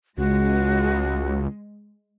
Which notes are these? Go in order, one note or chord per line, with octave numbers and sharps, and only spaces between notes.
C#2 G#3 F#4